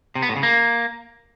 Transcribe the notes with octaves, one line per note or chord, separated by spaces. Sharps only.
C3
B3
A2
C#3
A#3